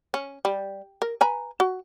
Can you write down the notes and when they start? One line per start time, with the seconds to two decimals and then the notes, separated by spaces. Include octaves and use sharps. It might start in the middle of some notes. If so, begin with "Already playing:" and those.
0.14 C#4
0.45 G3
1.02 A#4
1.21 B4 G#5 A#5
1.60 F#4